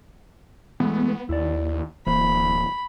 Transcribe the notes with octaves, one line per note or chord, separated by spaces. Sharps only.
E3 G#3 A3 B3
D#2 E4 D5
D1 E3 A#3 C5 B5